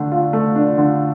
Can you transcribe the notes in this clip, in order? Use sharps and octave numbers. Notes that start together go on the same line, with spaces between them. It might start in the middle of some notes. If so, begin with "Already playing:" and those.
Already playing: D3 A3 D4
F4
A3
D4
D3